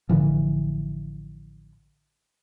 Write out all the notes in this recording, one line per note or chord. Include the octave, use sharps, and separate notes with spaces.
A1 D3 E3 F3